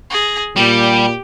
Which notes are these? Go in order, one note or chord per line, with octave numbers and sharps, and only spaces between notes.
G#4 A#6
A#2 G3 G4